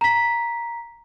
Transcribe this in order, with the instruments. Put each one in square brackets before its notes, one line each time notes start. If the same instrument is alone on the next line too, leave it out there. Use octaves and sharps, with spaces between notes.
[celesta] A#5 B6